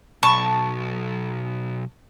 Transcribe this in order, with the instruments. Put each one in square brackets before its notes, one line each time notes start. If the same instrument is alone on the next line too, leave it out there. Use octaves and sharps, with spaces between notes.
[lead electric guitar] B1 [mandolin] A5 C#6